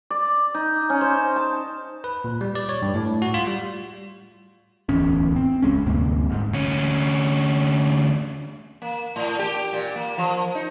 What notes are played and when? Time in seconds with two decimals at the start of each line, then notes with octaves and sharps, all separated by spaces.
0.10 D5
0.54 D#4
0.90 C#4
1.01 C5
1.36 A5
2.04 B4
2.24 A#2
2.41 G3
2.55 D5
2.69 C#5
2.82 G2
2.95 A2
3.22 F#4
3.34 F4
3.47 G3
4.89 D1 A1 E2 C#4
5.36 C4
5.62 E1 C#2 G#3 C#4
5.86 D2 G2 C3 A#3
6.30 F1 G#2
6.53 D2 C#4
8.82 A#3
9.16 A2
9.39 G4
9.73 A#2
9.96 A#3
10.18 F3
10.55 D#4